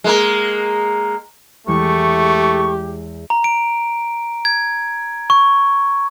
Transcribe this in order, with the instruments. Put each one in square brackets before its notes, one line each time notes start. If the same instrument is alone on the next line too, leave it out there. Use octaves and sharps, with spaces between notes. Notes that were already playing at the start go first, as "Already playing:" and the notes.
[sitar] G#3 A#3 A#4
[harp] E2 G#3 C#5 [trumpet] A3 [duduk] G4 [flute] C#6
[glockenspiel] A#5
D7
G#6
C#6